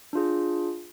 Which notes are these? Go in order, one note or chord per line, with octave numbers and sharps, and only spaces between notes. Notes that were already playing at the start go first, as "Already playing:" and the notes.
D4 F4 G#4